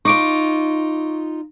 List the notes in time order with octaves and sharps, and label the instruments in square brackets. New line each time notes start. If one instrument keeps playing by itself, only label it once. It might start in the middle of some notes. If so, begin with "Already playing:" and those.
[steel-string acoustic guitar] D#4 F4 [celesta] C#6 D6 D7